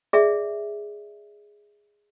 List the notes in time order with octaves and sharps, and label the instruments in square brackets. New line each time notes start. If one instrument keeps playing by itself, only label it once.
[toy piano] G#4 D5 E5